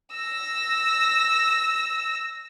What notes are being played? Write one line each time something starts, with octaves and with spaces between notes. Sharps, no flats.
E6 A#6